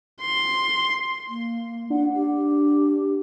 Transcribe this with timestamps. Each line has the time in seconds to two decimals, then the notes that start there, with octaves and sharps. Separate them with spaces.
0.21 C6
1.29 A#3
1.90 D4 F#5
2.15 G4